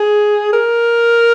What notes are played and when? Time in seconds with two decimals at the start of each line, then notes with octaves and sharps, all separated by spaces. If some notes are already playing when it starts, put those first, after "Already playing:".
Already playing: G#4
0.53 A#4